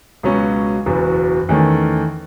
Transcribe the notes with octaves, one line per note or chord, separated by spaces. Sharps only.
C#2 B2 F#3 C#4
F#1 E2 B2 F#3
E2 D#3 A3 C#4